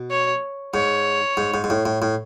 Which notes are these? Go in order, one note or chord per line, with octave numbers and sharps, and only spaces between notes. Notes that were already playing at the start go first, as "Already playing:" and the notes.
Already playing: B2
C#5
G#2 C#5
G#2
G#2
G#2
A2
A2
A2